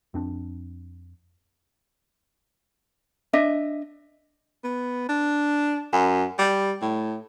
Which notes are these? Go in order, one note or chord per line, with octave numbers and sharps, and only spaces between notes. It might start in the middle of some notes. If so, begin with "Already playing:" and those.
F2 C4 D4
D4 D#5 E5
B3
D4
F#2
G3
A2